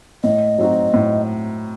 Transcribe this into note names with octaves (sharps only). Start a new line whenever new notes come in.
A2 D#5
F#3 C4 D#4 F#4
A2